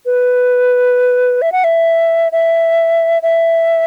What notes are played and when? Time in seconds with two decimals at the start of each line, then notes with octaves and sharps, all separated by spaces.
0.06 B4
1.42 E5
1.52 F#5
1.64 E5
2.32 E5
3.22 E5